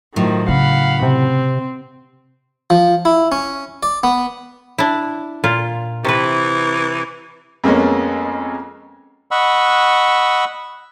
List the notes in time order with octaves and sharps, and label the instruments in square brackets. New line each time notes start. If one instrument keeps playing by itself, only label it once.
[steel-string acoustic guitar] A2 F#3 [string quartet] D#3 F3
[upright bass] C#3 [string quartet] F5 F#5 B5
[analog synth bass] C3 [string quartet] C4
[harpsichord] F3
E4
C#4
D5
B3
[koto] D4 E4
A#2 F4
[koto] C3 B4 [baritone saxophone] E3
[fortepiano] F2 G#3 A#3 B3 C#4
[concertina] D#5 F#5 B5 C#6 E6